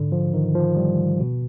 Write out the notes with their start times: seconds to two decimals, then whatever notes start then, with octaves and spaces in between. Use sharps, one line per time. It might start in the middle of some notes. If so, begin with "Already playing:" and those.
Already playing: G#2 D3
0.12 F3
0.34 D#3
0.55 F3
0.77 G3
1.20 B2